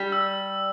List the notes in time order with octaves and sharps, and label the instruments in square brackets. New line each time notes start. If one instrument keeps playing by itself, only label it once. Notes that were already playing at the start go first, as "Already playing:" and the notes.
Already playing: [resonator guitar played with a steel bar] G3
[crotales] E6